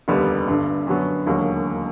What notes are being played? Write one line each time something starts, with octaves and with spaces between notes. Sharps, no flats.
F1 D#2 D3 G3 B3
G1 G2 D3
F#2 D3 F#3 B3
E1 D#2 D3 F#3 A#3